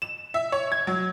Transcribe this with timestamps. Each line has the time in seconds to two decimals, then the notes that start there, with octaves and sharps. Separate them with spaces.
0.02 E7
0.34 E5
0.52 C#5
0.72 G#6
0.87 F#3